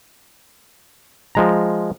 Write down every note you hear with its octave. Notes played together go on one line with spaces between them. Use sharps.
F3 G#3 A#5